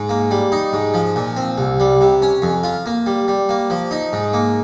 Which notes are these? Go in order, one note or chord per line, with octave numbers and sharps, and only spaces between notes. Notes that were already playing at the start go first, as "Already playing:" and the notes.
Already playing: G#2
A#3
G3
D#4
G#2
F3
A#2
C4
C2
G3
C3
C#4
F2
F4
A#3
G3
G3
A#3
F3
D#4
G#2
A#3